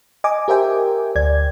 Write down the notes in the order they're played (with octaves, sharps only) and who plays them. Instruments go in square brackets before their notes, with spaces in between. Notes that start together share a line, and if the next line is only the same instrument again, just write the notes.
[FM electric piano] D#5 G#5 D6
G4 A#4 C5 E5 G5 G#5
D2 D5 G#6